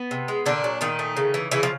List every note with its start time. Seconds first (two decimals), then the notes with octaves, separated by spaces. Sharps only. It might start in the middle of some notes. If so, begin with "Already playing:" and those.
Already playing: B3
0.11 C3
0.28 G#3
0.46 A#2 D3 D4
0.64 F#3
0.81 A#2 D#3 D#4
0.99 A3
1.17 C#3
1.34 E3
1.51 C#3 E3 E4
1.63 F3